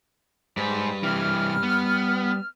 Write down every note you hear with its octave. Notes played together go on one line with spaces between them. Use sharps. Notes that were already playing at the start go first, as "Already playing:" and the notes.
G#2 G3 B4 C5
C3 E3 F6
B3